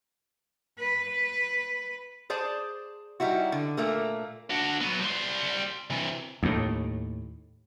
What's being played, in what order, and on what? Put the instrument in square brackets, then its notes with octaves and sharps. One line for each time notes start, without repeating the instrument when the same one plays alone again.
[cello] B4
[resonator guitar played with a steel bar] G#4 C5 D5 A5
G3 D#4 E4 F#4
D3
A#2 A3 A#3
[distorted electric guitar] D4 F#4
F#3 B3
G3 C6
C3 E3
[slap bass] D#2 A2